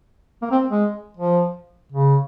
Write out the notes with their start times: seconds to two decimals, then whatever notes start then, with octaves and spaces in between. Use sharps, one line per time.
0.42 A#3
0.52 C4
0.70 G#3
1.17 F3
1.92 C#3